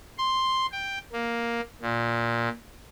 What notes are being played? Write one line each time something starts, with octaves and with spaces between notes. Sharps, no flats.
C6
G5
A#3
A#2